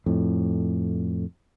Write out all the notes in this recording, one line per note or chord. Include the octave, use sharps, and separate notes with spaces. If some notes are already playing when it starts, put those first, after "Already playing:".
F2 A2